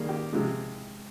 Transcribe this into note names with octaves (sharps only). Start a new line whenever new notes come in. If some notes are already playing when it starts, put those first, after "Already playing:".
Already playing: D#3 G3 A#3 G#4
G4
C3 F3 G#3